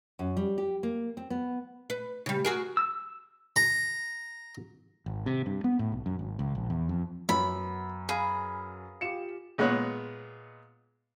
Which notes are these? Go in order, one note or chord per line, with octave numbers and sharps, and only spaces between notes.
F#2
G3
G4
A#3
C4
B3
B4
C#3 G3
F#4 G#4 A#4
E6
A#5
G#1
C3
G2
B3
A2
B1
F#2
G#1
C#2
A#1
E2
F2
F#2 B3 B5 E6
G#4 F5 A#5 B5
F4 G4 C#7 E7
A#2 G#3 B3 C#5 F#6